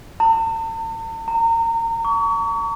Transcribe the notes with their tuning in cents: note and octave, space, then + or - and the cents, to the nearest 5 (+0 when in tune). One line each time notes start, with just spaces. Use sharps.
A5 +45
A#5 -30
C#6 +35